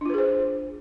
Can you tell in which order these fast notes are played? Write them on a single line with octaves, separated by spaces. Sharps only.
D4 F4 B4 G#4 C5